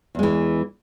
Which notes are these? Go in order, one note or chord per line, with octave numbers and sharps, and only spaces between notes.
E2 E3 G#3